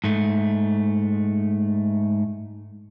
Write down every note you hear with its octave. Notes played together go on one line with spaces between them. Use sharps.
G#2 A3